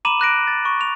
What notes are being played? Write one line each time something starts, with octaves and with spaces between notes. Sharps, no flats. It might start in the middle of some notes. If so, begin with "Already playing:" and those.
A#5 B5 D6 D#7 E7 F#7
D6 F#6 A#6 D7
A6
C#6
F7